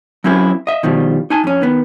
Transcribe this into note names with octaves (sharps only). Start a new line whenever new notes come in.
F#3 C4 C#4 E4 A#4
D#5 E5
B2 D#3 F3 G3
D#4 G#5 A5
F2 C#4
D#3 B3